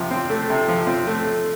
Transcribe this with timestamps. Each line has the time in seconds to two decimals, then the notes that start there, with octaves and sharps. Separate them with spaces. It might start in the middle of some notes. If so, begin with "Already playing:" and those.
Already playing: C3 F3
0.11 C4
0.30 A3
0.50 C3
0.68 F3
0.87 C4
1.07 A3